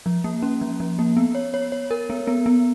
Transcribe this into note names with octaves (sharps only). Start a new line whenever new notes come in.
F3
A#3
C#4
F3
F3
A#3
B3
C#5
C#5
C#5
A#4
B3
B3
B3